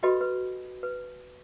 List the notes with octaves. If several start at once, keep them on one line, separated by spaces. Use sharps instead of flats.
F#4 G4 A4 B4 D#5 B5
B4
B4